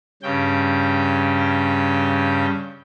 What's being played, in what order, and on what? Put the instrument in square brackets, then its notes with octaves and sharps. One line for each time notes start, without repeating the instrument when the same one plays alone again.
[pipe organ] G2 C#3 G5